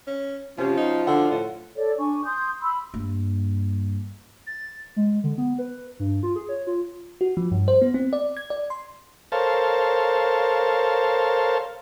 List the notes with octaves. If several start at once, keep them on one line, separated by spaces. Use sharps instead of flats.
C#4
C3 F3 F#3 C#4 F4
D#4
D3 F#5
A2
A4 C#5 D5
D4 G#5 C#6
C6 D#6 G6
B5 C6 E6
G2 A#3
A6
G#3
D3
B3
B4
G2
F4
G#4
C#5
F4
F#4
F3
G2
C5
B3
C4
D5
G#6
D5
C6
A4 A#4 C5 C#5 F5 A5